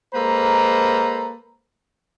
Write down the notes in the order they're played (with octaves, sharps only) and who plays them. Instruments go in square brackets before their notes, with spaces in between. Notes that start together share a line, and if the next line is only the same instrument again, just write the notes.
[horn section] G#3 A#3 A4 B4 C5 A#5